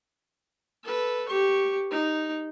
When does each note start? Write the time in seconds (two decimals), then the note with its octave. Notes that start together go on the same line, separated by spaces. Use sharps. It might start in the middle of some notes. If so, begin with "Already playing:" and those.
0.83 A4 B4
1.29 G4 C#6
1.91 D#4